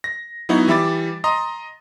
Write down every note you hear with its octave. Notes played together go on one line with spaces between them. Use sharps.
A#6
F#3 B3 D#4 E4 F#4
E3 G3 E5 B5 D6 A6
D#5 A#5 C6 D#6